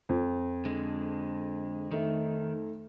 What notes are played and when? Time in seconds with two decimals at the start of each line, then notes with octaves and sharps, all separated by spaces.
0.09 F2
0.65 D3 G#3
1.91 D#3 A3 D#4